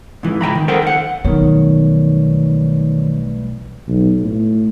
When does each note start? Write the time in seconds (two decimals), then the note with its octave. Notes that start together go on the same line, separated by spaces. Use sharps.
0.23 G#2 E3
0.41 C#2 G5 A#5 B5
0.55 D#3
0.68 A4 A#4 C5 F#5 G5
0.82 D#2 F#5
1.25 B1 D#3 E3 G3 A3 B3 C#5
3.88 B1
4.22 A2